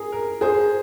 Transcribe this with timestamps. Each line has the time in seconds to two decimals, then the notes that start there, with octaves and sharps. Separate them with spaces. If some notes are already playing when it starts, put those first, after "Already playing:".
Already playing: G#4 A#4
0.12 A#4
0.41 G#4 C5